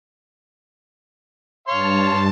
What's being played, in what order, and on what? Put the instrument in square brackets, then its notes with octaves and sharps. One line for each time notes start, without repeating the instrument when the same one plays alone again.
[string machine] G2 A5 [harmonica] C#5 F5 C6